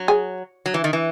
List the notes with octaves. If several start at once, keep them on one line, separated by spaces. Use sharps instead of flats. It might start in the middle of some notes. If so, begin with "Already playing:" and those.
Already playing: F#3
G#4
F#3
E3
D#3
E3